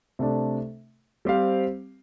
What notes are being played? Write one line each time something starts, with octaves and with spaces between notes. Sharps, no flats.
C3 A3 D4
G3 C4 G4 C5 F5